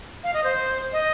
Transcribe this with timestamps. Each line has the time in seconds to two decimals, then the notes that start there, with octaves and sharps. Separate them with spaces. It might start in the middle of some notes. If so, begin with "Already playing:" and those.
0.24 F5
0.34 D#5
0.44 C5
0.93 D#5